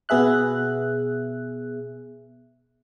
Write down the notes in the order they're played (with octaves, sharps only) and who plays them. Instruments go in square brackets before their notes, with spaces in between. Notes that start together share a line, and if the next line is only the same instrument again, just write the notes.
[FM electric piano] B2 B3 G#4 E5 F#6